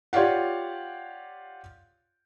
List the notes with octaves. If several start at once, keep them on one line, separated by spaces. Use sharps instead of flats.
F4 G4 C#5 D5 F5 F#5